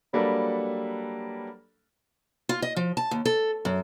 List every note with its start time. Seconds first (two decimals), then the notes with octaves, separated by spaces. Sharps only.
0.13 F#3 G3 A#3 D4 A4 B4
2.49 F4
2.62 D#5
2.76 F3
2.97 A5
3.11 D#2
3.25 A4
3.65 F#2